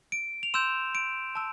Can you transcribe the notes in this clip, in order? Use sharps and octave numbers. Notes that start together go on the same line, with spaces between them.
D7
F7
C6 E6 G6 E7
D7
A5 E6